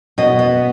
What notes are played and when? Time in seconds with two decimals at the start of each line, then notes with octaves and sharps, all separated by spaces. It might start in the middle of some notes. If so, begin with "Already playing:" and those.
0.18 B2 D#5
0.39 B3